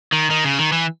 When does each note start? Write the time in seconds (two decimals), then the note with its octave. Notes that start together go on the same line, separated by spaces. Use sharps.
0.12 D#3
0.30 D#3
0.44 C#3
0.59 D#3
0.72 E3